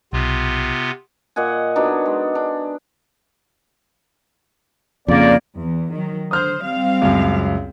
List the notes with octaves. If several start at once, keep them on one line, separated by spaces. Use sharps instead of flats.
B1 C3 B3 F4
A#2 D#5 F#5 G#5
F#3 B3 D4 D#4
G#3
D4
F2 C#3 A#3 D5
E2
D#3 F#3
D3 C5 D#6 F6 G6
G3 C4 F5
C#2 F#2